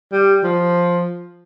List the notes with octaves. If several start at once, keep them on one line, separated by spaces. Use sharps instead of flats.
G3
F3